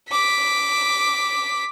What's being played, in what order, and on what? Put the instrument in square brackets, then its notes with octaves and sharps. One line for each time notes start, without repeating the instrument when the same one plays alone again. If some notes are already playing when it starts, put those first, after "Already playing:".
[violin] D6 B6